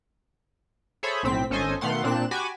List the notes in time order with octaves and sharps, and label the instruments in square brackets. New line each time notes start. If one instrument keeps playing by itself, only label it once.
[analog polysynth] G#4 A4 C5 C#5 E5 B5
B1 A2 C4 B6
G#1 C#4 A4 C5 D#5 G#5
B2 D#3 A3 F5 F#5 C6
A#2 C4 D4 F#6 E7
F#4 G4 G#5 B5 D6 E7